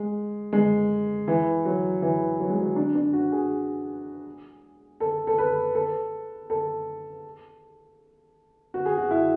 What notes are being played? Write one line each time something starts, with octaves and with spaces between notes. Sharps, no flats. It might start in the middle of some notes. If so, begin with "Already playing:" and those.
Already playing: G#3
G#3
E3
F#3
E3
F#3
G#3
F#3
D4
D4
F#4
G#4
A4
A4
B4
A4
A4
F#4
G#4
F#4
E4